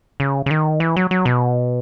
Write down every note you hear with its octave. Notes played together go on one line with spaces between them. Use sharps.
C#3
C#3
D#3
E3
F#3
F#3
B2